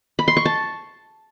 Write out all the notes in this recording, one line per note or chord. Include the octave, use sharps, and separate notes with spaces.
B5
C6
C#6
A5